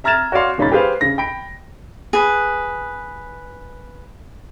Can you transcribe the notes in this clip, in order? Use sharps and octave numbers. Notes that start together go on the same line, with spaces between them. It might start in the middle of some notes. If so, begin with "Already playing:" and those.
E5 A#5 F6 G#6 A6 E7
F#4 C#5 D5 F5 C6
D#1 C#3 C#4 D#4 B5 A6
G4 G#4 B4 C5 F5
C#3 A#6
G5 B5 D7
G#4 B4